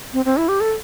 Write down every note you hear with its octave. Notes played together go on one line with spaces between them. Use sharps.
C4
C4
E4
G4
A4